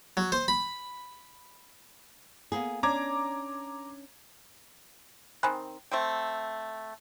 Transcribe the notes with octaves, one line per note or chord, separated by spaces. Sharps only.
F#3
C5
B5
A#3 B3 G#4
C#4 D4 A#5 D6 G#6
D#3 C4 G#5 B5 F#6
A3 C4 G5